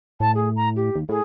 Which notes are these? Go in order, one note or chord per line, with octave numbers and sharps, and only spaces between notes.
A2 A5
G#4
A#5
G4
D#2
A2 G#4